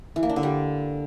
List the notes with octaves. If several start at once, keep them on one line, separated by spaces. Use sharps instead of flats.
E3
A#3
D4
D3
G3